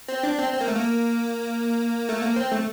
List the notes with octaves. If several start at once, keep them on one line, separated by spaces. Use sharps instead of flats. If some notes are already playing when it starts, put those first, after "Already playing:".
C4
D4
C4
C4
A#3
A3
A#3
A3
A#3
C4
A3